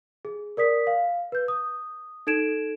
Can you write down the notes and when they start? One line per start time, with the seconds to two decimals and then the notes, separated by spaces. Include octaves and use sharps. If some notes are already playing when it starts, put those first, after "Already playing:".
0.25 G#4
0.57 A#4 D5 D#6 B6
0.87 F5
1.32 B4 G6
1.48 D#6
2.27 D#4 A4 G#6 D7 E7